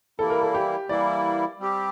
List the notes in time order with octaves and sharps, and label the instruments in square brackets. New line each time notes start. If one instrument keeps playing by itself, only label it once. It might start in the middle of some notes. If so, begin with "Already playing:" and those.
[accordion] E3 G3 A#3 E4 [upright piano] A4
[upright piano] A#4
A4
G4
[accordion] E3 G3 A#3 E4 [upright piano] D5
[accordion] G3 C4 G4